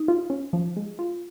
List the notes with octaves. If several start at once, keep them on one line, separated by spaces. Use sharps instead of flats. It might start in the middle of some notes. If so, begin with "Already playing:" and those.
Already playing: D#4
F4
C#4
F3
G#3
F4